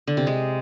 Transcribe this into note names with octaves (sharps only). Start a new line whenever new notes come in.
D3
C3
G#3